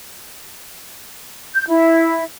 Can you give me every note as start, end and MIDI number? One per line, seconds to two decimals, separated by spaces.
1.55 1.64 91
1.69 2.23 64